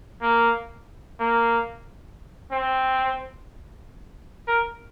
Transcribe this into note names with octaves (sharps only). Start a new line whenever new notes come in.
A#3
A#3
C4
A#4